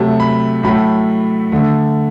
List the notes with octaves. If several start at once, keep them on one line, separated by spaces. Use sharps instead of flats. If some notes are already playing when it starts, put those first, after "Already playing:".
Already playing: C3 F#3 A3 A5
B5
A2 F#3 A3 B5
D3 A3